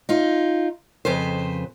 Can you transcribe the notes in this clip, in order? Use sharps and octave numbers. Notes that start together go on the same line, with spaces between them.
D#4 F4
F2 C#3 B4 C5